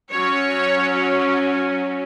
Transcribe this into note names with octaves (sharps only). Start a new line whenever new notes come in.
F#3 C#4 C#5